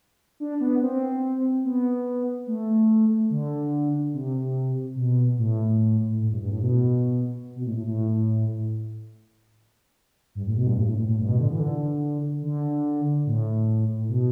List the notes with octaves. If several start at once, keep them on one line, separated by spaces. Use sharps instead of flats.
D4
B3
C4
B3
A3
D3
C3
B2
A2
A2
G2
G2
A2
B2
B2
A2
A2
A2
G2
A2
B2
G2
A2
A2
A2
A2
G2
B2
D3
E3
D3
D3
A2
B2